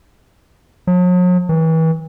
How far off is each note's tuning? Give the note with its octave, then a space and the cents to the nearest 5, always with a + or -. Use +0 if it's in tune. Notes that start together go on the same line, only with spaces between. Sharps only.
F#3 -45
E3 -35